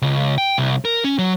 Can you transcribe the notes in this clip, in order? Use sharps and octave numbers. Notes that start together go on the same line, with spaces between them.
C#2
G5
C2
A#4
C#4
F#3